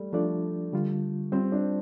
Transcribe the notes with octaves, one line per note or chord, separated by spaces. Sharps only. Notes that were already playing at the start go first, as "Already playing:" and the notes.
Already playing: G3 A3
F3 A3 D4 F4 D5
D3 G3 F4
G3 C4 F4 C5
D4